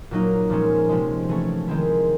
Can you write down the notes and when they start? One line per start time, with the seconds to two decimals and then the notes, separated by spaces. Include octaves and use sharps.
0.11 A#2 F#3 A#3 D#4
0.50 A#2 F3 G#3 C#4
0.89 C3 F3 G#3
1.29 E3 A3 C#4
1.68 D#3 G#3 C4 E4